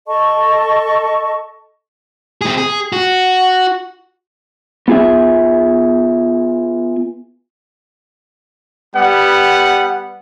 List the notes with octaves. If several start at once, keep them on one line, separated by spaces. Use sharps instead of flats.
A4 D#5 A5 C#6
C4 G#4
G#4
F#4
B3 F4 G#4 E5
G3 B3 F#5